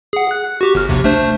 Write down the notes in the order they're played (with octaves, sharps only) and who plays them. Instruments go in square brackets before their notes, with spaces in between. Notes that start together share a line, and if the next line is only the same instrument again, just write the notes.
[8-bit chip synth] G#4 F#5
F#6
F#4 G4 C#6
G1 F6
A#1 D#2 C3
A3 D4 C5